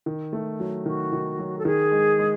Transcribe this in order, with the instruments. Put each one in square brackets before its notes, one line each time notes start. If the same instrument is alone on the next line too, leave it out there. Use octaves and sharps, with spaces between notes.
[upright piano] D#3
A3
F#3
[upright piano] D#3 [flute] F#4
[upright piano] D#3
F#3
[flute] A4
[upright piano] D#3 [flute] G#4
[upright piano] G#3
G#3